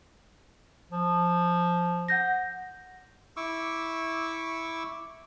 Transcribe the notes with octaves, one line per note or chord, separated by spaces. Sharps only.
F3
F#5 G6 A#6
E4 C#6 D6 E6